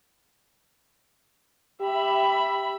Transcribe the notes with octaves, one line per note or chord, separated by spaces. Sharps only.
G4 E5 B5